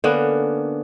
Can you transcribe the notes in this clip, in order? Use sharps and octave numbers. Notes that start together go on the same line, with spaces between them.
D3 A#3 B3 C#4